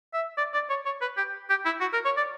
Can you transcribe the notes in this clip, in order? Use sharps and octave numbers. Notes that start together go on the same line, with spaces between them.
E5
D5
D5
C#5
C#5
B4
G4
G4
E4
F#4
A#4
C#5
D5